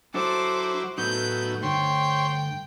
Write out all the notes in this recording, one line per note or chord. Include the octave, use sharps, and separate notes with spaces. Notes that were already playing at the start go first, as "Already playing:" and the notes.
F#3 D4 E4 A4 C5 D6
A2 F#3 A3 B3 D#4 G6
G2 D3 A3 C5 C#5 G5 C6